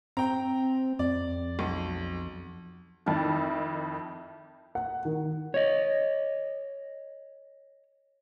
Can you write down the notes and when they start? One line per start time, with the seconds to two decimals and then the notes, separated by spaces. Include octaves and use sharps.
0.17 C4 G5 A#5
0.99 F2 D5
1.59 B1
3.06 F2 D#3 E4 A5 D6
4.75 F#5
5.05 D#3
5.54 C#5 D#5